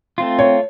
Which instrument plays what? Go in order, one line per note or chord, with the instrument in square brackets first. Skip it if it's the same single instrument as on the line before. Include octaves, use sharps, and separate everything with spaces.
[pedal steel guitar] A3 C4 F4
[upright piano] C#5